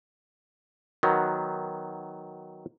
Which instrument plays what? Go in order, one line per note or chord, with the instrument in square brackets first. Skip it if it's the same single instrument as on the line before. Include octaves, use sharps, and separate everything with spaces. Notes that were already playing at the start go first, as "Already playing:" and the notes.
[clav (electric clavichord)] D#3 F#3 B3